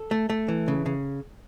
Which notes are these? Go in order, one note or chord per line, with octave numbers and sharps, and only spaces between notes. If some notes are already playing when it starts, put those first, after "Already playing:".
Already playing: A4
A3
A3
E3
C#3
C#3